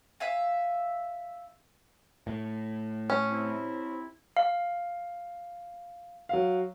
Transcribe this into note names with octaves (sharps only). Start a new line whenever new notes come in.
E5 F5 G#5
A2
C#4
C3 C4 E4
F5
F#3 F5